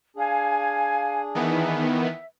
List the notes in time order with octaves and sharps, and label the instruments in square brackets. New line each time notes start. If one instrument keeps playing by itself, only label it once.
[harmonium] D4 G#4 [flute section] F5 G#5
[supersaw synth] D#3 E3 B3 [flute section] E5